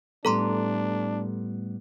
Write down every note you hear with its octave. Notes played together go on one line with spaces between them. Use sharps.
A2 G3 B3 D4 A4 A#5 C6